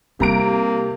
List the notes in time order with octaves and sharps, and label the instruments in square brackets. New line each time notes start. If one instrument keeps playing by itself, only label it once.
[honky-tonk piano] C3 A#5 D7 [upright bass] G3 E4 [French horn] A#3